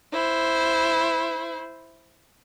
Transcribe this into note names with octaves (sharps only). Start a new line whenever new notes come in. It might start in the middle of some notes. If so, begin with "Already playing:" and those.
E4 C5